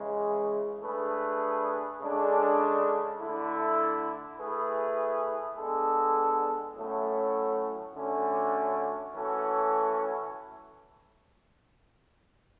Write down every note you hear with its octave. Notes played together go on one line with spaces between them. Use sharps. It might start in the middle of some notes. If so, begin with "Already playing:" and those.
Already playing: C#3 E3 G#3
A3 D4 G#4 B4
C#3 G#3 D4 A4
D3 A3 E4
A3 E4 G#4 B4
G#3 B3 D4 A4
A2 F#3 A3 C#4
D3 A3 C#4 F#4
E3 A3 C#4 F#4 A4